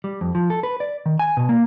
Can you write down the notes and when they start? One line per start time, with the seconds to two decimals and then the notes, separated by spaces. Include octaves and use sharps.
0.04 G3
0.21 F2
0.35 F3
0.50 A4
0.63 B4
0.80 D5
1.06 D#3
1.19 G#5
1.37 B2
1.49 A#3